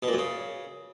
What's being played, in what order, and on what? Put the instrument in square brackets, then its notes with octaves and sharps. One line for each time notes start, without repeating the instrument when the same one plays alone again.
[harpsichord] B2
A#2
F#2
C#3